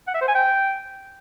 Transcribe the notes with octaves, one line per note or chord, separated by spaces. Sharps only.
F#5
E5
C5
G#5
G5